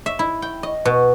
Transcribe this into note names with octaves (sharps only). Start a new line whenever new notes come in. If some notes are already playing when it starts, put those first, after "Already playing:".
E5
E4
G5
D#5
B2